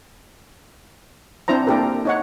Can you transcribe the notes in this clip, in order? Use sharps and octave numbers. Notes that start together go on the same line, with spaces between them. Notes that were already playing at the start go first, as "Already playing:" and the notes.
C4 D4 E4 C5 A#5
A#3 D4 E4 G4 A4 A#4
D#4 C#5 F#5